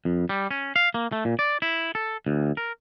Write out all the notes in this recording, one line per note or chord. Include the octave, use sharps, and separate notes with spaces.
F2
G3
C#4
F5
A#3
A3
A#2
D5
E4
A4
D2
A#4